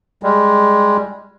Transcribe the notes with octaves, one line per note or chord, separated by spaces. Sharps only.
G3 G#3